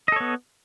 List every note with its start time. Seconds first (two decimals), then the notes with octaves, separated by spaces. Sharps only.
0.08 D#5
0.12 A4
0.16 C#5
0.20 B3